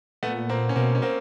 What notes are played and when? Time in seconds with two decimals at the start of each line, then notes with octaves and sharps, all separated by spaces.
0.23 A#2 A3 B3
0.49 A#3 C4
0.69 C#4
0.76 B2 A#3 C4
0.95 C#4
1.02 A#3 C4